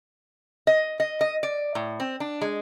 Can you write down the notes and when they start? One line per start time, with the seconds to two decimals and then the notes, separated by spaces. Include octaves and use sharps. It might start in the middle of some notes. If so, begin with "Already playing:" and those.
0.67 D#5
1.00 D#5
1.21 D#5
1.43 D5
1.75 A2
2.00 C4
2.20 D4
2.41 G#3